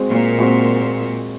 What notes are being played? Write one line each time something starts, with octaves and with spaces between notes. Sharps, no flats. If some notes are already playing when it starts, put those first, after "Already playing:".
Already playing: G#3 C4 F#4 C5
A#2
G#3 C4 F#4 C5